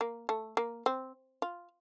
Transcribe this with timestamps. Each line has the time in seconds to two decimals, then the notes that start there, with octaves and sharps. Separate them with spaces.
0.01 A#3
0.29 A3
0.57 A#3
0.86 C4
1.42 F4